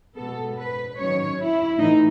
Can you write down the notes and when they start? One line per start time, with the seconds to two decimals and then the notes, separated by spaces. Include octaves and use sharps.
0.15 B2 G#3 B3 A4
0.56 B4
0.97 D#3 F#3 C#4 C#5
1.37 E4
1.78 A2 E3 D#4